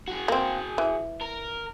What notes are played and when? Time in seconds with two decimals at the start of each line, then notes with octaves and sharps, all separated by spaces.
0.08 F#4 G#4
0.28 A#3 C4
0.78 E3
1.21 A#4